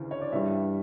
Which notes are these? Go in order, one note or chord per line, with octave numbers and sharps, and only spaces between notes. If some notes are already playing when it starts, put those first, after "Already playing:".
Already playing: D2 C#3 E3
C#5
D5
G2 E3 G3 E5